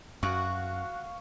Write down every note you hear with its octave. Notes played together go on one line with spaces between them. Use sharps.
F#2 F#4 F5 C#6